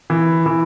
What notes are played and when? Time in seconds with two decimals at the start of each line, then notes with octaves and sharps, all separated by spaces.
0.10 E3
0.46 E3